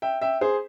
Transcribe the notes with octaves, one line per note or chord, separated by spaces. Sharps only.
E5 G5
E5 G5
G#4 C5